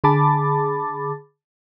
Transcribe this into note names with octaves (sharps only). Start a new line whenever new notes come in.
D3 G#4 A5 B5 D6 A6